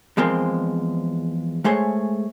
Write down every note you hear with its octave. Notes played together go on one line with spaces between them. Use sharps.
E2 F3 G#3 A#3 C4
G#3 A3 G#4 C5 C#5